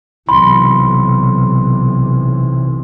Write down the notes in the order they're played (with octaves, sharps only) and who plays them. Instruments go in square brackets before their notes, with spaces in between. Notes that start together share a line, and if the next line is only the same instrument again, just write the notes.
[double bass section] B1 [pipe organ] C3 E3 [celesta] B5 [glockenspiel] C6